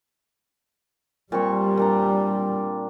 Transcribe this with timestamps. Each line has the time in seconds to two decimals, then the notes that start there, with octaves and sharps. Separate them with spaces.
1.32 A#2 G3 C4 C#6
1.77 A#2 D4 A#5